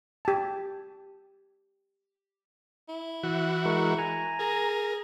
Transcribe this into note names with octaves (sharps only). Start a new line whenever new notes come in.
G4 A5
E4
E3 F#4
G#3 A#4 C#6
G#5 A#5
G#4 A#4